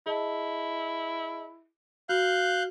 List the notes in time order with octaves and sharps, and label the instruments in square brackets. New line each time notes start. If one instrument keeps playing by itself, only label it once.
[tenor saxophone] E4 [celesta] G#4 D#5 A5
[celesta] F#4 [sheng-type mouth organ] F5 F#6 G6